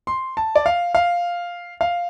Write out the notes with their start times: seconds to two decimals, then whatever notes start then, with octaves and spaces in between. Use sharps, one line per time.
0.07 C6
0.37 A5
0.55 D5
0.66 F5
0.95 F5
1.81 F5